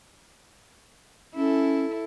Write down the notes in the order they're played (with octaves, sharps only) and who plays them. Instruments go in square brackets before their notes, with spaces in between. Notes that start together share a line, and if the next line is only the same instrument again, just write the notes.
[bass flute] C#4 [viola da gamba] E4 A4